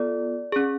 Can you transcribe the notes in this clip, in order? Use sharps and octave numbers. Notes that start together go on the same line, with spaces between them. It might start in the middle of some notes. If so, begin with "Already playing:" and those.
Already playing: B3 F4 A4 D5
C#4 G#4